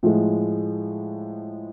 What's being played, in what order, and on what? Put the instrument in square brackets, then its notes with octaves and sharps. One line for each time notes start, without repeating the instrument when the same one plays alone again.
[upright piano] A2 F3 G#3